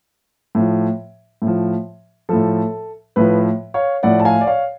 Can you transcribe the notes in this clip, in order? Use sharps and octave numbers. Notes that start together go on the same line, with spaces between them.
A2 F3
A2
F3
A2 F3 A4
A2 F3 B4
C#5 F5
A2 F3 D5 F#5
A5
F5 G#5
D5
C#5 F5